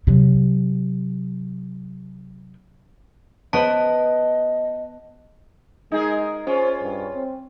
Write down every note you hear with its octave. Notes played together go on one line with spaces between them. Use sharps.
C3 F#3
B3 B4 C5 D#5 A5
G#3 D#4 G#4 A#4
C#4 F4 C5
G2
C4